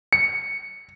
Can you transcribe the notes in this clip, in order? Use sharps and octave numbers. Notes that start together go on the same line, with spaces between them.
C#7